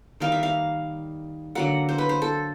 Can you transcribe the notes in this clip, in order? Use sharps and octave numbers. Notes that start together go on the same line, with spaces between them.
D#3 G3 A#3 F5
E5
F5
D3 F#3 A#3 F#5
C5
B4
C5
A4